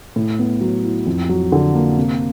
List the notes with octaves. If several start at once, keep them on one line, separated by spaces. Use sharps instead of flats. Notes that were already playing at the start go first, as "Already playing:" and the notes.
A2
B3
F#3
E4
F2
F#3
D3
A#3
C3